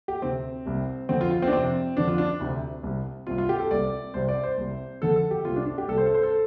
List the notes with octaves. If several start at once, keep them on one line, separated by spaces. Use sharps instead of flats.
G4
D2 C3 C4
C2 C3
F2 D3 C4
F4
F4
C4
D4
F2 C3 C4
F2 D3 D4
F4
D4
D2 C3
C2 C3
C2 C3 F4
F4
G4
A4
C2 C3 D5
C2 C3 C5
D5
C5
C2 C3
F2 D3 A4
A4
G4
C2 C3 F4
D4
D4
G4
C2 C3 A4
C5
A4
C5
A4